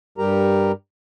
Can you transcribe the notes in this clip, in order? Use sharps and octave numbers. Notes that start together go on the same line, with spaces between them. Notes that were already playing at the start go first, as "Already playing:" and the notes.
G2 G3 G4 A#4 A#5